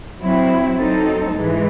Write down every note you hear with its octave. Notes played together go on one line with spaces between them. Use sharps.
F#3 C4 E4
F#3 C4 D#4 A4
G#2 E3 G#3